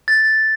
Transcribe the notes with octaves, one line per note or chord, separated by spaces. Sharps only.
A6